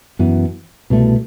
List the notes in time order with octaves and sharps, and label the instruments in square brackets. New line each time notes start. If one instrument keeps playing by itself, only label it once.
[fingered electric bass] F#2 E3 B3
C2 B2 A3